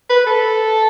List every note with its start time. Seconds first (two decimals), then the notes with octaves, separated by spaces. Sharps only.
0.10 B4
0.26 A4